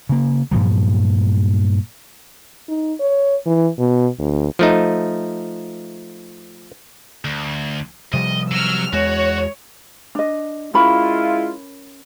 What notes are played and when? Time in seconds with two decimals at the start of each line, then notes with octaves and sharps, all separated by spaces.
0.09 C#3 A#3
0.51 G2 A#2 F3 F#3
2.68 D#4
3.00 C#5
3.46 E3
3.79 B2
4.19 D2
4.59 F3 A3 D#4
7.25 D2
8.14 C3 F3 G3 D#5
8.51 F#3 E6 F6
8.93 E2 G#3 F#4 C#5
10.15 D4 D#5
10.74 G#3 C#4 E4 F4 A#4 B5